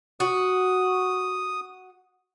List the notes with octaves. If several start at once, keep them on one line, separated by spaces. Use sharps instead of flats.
F#4 D#6